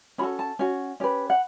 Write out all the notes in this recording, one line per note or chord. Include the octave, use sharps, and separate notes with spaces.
C#4 F#4 A4 B5
A5
C#4 F#4
C#4 G4 B4
F#5